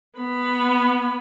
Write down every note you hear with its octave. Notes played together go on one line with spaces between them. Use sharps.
B3 B5